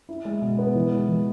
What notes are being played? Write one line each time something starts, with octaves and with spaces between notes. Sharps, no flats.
E4
G#3
B2
B3
E3
G#3
E3